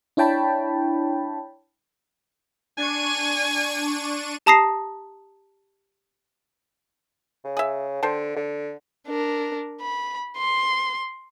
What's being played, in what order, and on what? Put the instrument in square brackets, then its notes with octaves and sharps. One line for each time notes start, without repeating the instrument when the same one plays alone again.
[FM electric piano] D4 E4 C#5 G5 A5 B5
[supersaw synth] D4 C#6 D#7 [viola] G#5
[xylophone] G4 A5 A#5 D#6 A#6 C7
[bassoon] C#3
[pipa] G#4 E5
[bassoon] D3 [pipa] C5 G5 A5
[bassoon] D3
[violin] D4 A#4
B5
C6